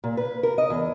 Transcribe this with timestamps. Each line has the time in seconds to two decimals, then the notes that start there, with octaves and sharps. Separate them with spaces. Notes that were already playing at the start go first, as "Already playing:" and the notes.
0.04 A#2
0.17 B4
0.43 A#4
0.58 D#5
0.70 E2